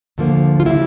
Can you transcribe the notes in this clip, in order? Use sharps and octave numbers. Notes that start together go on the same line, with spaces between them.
D2 D3 F3 A#3
F4
C#3 G3 A#3 E4